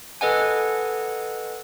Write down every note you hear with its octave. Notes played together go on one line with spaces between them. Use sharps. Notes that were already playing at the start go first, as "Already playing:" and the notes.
A4 B4 D#5 F#5 G#5